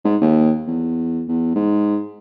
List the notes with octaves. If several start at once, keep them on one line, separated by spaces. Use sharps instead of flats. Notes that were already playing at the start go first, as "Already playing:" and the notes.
G#2
D#2
E2
E2
G#2